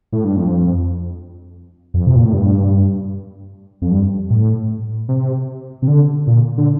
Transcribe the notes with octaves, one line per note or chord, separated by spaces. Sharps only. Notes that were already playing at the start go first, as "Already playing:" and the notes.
A2
G2
F2
F2
C3
A#2
A2
G2
F2
G2
A2
C3
C3
D3
A#2
D3